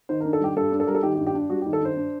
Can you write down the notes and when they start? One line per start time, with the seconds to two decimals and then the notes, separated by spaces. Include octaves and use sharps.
0.09 D#3 C5
0.20 A#4
0.25 D4
0.33 A4
0.40 G3 G4
0.56 G2 A4
0.72 D4
0.80 A4
0.87 G3 A#4
0.95 A4
1.03 D#3 G4
1.15 G4
1.19 G2
1.27 G4
1.34 D4
1.50 G3 F#4
1.62 G4
1.66 D#3
1.73 A4
1.80 G2 C5
1.97 D4